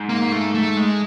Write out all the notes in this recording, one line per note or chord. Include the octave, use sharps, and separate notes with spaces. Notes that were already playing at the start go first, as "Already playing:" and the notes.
Already playing: G#2
A#3
A3
A3
G#3